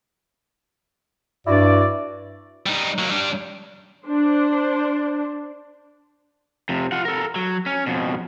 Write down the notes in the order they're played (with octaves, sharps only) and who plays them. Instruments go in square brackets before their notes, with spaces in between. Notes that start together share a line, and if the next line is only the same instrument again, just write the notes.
[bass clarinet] G2 [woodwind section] E4 F#4 D5
[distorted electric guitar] G3 D#4
F#3 A#3
G3 D4
[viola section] D4 C5
[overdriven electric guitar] F2 C3
F4 F#5
A4 A#4
F#3
C#4
F2 B2